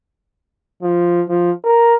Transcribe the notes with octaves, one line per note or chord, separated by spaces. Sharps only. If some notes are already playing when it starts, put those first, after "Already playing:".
F3
F3
A#4